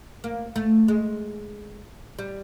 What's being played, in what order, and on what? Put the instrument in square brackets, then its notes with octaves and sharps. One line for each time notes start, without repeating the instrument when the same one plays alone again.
[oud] A#3
A3
G#3
G3